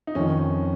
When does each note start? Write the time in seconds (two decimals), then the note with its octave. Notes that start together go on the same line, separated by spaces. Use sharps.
0.07 D#4
0.15 F2 D#3 C#4